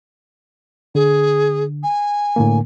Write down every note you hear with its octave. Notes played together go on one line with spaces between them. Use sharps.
D3 G#4
G#5
A2 D3 A#3